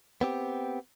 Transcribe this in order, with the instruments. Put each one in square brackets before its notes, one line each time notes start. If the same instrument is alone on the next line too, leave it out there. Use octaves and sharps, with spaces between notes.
[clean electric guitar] B3 C4 G4